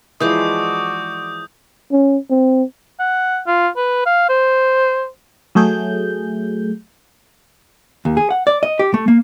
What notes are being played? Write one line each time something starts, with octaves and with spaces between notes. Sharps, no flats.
E3 F3 G#3 F#4 D5 D#6 G6
C#4
C4
F#5
F4
B4
F5
C5
F#3 A3 G#4 G6
D#2
G#4
F#5
D5
D#5
G4
A3
A#3